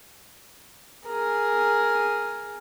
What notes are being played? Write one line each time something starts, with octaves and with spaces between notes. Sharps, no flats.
G#4 A#4